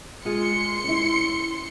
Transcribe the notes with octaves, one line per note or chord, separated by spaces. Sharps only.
G#3 F4 G#4 C6 C#7
C#4 E4